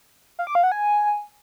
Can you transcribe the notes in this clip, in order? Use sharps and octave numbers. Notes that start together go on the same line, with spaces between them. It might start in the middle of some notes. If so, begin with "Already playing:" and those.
F5
D6
F5
F#5
G#5